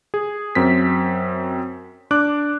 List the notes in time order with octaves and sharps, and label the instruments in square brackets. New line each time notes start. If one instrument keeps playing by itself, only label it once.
[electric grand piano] G#4
F#2 C4 B6
D4 D6 F#6